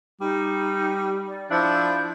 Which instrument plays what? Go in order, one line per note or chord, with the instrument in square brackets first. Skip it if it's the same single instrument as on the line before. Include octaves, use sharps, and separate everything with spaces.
[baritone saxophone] G3 [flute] D#4
[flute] D5
[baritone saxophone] F3 [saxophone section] D4 E4 [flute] G6